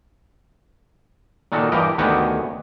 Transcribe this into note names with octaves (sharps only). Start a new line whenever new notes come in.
A#2 D#3 F#4 A4
G2 E3 G4 A#4 D#5
D2 D#3 B3 F#4 G4 G#5